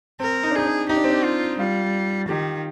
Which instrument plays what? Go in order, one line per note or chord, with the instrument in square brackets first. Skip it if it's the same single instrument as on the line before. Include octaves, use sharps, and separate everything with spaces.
[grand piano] C4 [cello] A#4
[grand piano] D#4
D4
[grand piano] D#4 [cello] G#4
[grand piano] D4
[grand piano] D#4 [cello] G4
[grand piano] D4
C4
D4
[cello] F4
[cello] G3 [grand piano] F4
[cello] D#3 [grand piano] G4